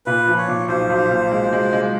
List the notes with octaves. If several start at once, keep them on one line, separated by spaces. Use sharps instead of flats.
A#2 B4
F3
C#5
A#2
B1 C5
B1
A#2
G#3
G#3
G#3